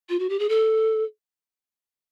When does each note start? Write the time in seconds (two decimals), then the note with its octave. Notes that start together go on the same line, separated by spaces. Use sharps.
0.09 F4
0.19 F#4
0.30 G4
0.39 G#4
0.49 A4